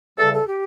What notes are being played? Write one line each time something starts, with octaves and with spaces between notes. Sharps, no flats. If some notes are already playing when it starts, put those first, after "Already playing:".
E2 C#3 G3 A4
A4
G4